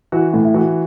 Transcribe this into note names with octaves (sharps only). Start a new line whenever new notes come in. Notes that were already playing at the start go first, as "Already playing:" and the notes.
E3 F#4
A2
E4
E3 F#4